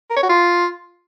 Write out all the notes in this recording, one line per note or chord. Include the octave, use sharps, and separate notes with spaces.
A#4
C#5
F#4
F4